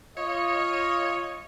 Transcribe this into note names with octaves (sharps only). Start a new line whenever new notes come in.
F4 C#5 D#5